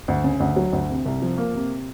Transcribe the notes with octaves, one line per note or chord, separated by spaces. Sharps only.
D2
C#3
D2
F#3
D2
C3
C2
F3
A#3
C3